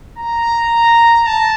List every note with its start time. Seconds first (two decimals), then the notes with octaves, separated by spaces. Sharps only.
0.18 A#5
1.26 A5